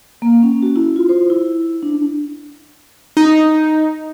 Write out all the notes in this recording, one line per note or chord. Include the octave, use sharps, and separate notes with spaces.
A#3
C#4
F#4
E4
F4
C5
E4
D4
D#4